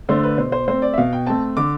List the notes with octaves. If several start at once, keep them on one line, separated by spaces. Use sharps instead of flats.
D3 A3 D4 C5
B4
B2 C5
C5
A3 C4 C5
D5
E5
B2 F5
G5
A3 C4 A5
D3 D6